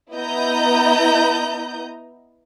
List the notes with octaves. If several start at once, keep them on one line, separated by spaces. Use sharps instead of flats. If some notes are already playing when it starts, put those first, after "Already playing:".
B3 E4 D#5 A#5 G6